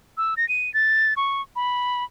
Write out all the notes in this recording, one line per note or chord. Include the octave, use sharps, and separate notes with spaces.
E6
A#6
D#7
A6
C#6
B5